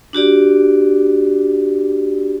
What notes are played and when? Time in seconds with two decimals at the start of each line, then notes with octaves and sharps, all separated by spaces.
0.13 D4 F#4 G4 D5